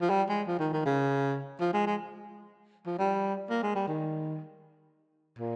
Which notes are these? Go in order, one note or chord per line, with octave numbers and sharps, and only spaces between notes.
F3
G3
G#3
F3
D#3
D#3
C#3
F3
G#3
G#3
F3
G3
A#3
G#3
G3
D#3
A#2